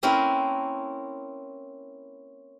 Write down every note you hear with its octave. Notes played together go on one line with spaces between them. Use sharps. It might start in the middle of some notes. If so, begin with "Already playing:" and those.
A#3 C4 C#4 E4 A#4 B4